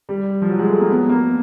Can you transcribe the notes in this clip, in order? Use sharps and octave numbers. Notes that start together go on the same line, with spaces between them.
G3
F3
F#3
G#3
A3
A#3
B3
A#3